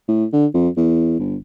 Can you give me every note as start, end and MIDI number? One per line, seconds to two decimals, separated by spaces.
0.08 0.25 45
0.33 0.46 50
0.54 0.69 41
0.77 1.18 40
1.19 1.36 31